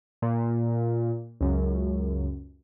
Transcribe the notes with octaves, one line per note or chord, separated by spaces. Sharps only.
A#2
C#2 F#2